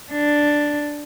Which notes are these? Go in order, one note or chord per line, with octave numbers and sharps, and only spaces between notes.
D4